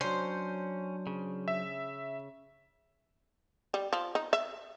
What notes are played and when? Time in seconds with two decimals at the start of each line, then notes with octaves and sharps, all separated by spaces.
0.01 F#3 C#4 D4 C5
1.07 C#3
1.48 E5
3.74 G3
3.93 F3
4.15 D#4
4.33 E5